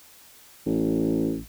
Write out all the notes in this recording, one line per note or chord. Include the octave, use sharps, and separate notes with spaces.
A1